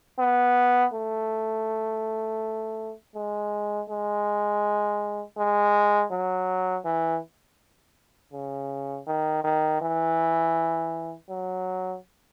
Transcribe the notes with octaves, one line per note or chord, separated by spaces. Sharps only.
B3
A3
G#3
G#3
G#3
F#3
E3
C#3
D#3
D#3
E3
F#3